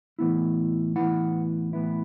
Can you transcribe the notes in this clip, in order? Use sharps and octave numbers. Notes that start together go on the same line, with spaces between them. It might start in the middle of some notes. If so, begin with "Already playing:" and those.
A2 E3 B3 E4
A2 E3 B3 E4 F#5
A2 E3 B3 E4